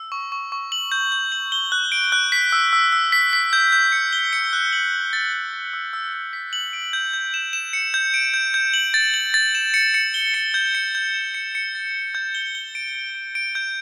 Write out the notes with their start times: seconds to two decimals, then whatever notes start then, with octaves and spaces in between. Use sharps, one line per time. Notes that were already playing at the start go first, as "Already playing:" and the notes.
Already playing: E6
0.12 C#6
0.32 C#6
0.52 C#6
0.72 F#7
0.92 G6
1.12 G6
1.32 F#7
1.52 G7
1.72 F#6
1.92 D7
2.12 F#6
2.32 B6
2.52 E6
2.73 E6
2.92 E6
3.12 B6
3.33 B6
3.53 G6
3.73 G6
3.92 C#7
4.13 G7
4.33 C#7
4.53 F#6
4.73 F#7
4.93 F#7
5.13 A6
5.33 A6
5.53 A6
5.73 E6
5.93 E6
6.13 E6
6.33 B6
6.53 F#7
6.73 D7
6.93 G6
7.14 G6
7.34 E7
7.53 E7
7.73 C#7
7.94 G6
8.14 D7
8.34 G6
8.54 G6
8.74 F#7
8.94 A6
9.14 F#7
9.34 A6
9.55 E7
9.74 C#7
9.94 C#7
10.14 G7
10.34 C#7
10.54 G6
10.75 C#7
10.95 G6
11.14 E7
11.34 C#7
11.55 C#7
11.75 A6
11.95 G7
12.15 G6
12.35 G7
12.55 G7
12.75 D7
12.95 D7
13.15 D7
13.35 D7
13.55 G6